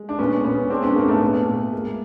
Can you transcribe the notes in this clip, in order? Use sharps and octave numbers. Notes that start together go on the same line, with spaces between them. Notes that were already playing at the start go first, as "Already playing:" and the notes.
Already playing: G#3
D4
A#2 B3 C#4
A#2 B3 C#4
G#3 C4 D4
B3 C#4
G#2 A#3
A3 B3
A#2 A3 B3
A#2
G#3 A#3